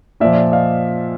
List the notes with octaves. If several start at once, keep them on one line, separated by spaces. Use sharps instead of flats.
A#2 F3 D5 E5
D#5 F5